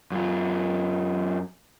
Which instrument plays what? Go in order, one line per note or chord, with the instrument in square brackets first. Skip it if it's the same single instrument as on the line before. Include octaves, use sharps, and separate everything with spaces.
[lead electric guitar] F#2 F4